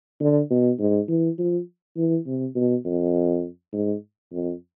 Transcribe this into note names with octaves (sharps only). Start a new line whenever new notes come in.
D3
B2
G#2
E3
F3
E3
C3
B2
F2
G#2
F2